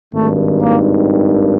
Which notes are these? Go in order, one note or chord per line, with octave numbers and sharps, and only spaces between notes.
G#1 G2 D#3 A3
A#3